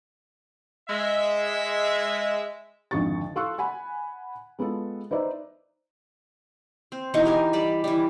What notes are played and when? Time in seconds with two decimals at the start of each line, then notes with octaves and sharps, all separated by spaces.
0.89 G#3 E5
2.91 G#1 F2 D3 C#6 A6
3.36 A4 F5 C6 C#6 E6 F#6
3.58 F#5 G#5 B5
4.59 G#3 B3 F4 A4
5.11 D#4 B4 C5 D5 E5
6.92 C4
7.14 B2 E3 D#4
7.25 G4 A#4 G#5
7.53 G3 D5 B5
7.84 E3 G3